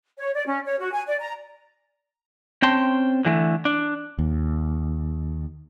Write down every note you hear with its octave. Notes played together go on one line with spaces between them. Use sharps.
C#5
D5
C#4
C#5
F#4
G#5
D5
A#5
C4 C#4 G5 A5 C6
D3 E3 G#3 A3
D4
D#2